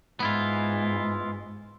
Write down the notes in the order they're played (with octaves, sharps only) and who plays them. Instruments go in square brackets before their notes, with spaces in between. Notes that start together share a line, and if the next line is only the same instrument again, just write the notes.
[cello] G#2 [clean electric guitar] B3 E4 F4